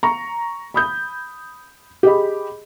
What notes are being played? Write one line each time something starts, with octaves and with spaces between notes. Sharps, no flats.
A#5 C#6
B5 D#6 G6
G4 G#4 D#5 B5